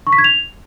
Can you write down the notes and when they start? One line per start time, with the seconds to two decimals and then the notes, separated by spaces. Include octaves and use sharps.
0.07 C#6
0.13 B6
0.18 G#6
0.24 F7